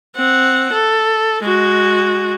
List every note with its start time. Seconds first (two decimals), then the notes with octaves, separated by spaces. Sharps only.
0.16 C4 F#5
0.72 A4
1.42 G#3 F#4